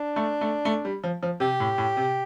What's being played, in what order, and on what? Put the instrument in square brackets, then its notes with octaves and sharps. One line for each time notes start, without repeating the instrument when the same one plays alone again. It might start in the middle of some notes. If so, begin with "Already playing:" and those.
Already playing: [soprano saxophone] D4
[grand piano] A3
A3
A3
G3
F3
F3
[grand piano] C3 [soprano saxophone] G4
[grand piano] A2
A2
C3